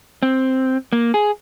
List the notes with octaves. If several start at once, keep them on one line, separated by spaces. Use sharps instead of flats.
C4
A#3
G#4